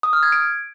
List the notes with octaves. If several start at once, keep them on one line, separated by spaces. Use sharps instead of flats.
D#6
F6
G#6
D7